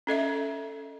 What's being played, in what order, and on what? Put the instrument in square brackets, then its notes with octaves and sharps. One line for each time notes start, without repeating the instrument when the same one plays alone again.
[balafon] C#4 A4 D#5 E5